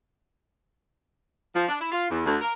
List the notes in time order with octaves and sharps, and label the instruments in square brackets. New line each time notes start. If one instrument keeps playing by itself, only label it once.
[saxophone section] F3
D4
E4
F4
E2
D2
A#4